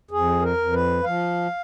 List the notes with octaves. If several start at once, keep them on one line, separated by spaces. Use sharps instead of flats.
F2 G#4
A#4
F2
B4
F3 F5